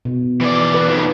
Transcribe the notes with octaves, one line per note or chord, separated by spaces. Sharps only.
B2
E3 D5
B4
F2 D#3